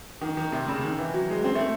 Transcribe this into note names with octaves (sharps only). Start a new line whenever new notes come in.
D#3
D#3
C3
C#3
D#3
E3
F#3
G#3
C4
A3